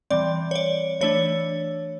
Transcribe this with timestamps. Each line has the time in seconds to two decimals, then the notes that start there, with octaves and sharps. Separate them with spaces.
0.10 E3 G3 C4 D5
0.51 C#5
0.55 D5
1.01 E3 A3 D4 C#5